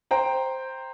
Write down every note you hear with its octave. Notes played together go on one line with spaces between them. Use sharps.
C5 G5 A#5